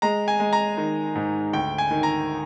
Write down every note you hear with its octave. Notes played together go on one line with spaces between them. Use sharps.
G#3 A#5
G#5
G#3
A#5
D#3
G#2
D2 G5
G#5
D#3
A#5